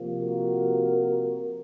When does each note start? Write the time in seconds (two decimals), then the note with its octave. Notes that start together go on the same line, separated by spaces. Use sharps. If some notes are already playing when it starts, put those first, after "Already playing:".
Already playing: C3 F3 A#3
0.18 F#4 A#4